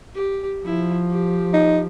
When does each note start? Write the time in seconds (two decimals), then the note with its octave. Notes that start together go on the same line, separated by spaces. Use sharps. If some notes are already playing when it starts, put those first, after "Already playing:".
0.15 G4
0.65 F3 E4
1.10 G4
1.53 D#4